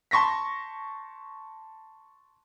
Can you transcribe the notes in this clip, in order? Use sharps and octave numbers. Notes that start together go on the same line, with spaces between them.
A5 C6 C#6 A#6 B6